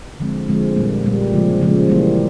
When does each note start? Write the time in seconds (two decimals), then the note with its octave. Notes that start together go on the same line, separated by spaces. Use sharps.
0.20 D3 F3 G#3 C4
0.49 D3 F3 G#3 C4
0.76 A#2 G3 A#3
1.04 A#2 G3 A#3
1.33 C#3 F3 G#3
1.62 C#3 F3 G#3
1.89 E3 G3 A#3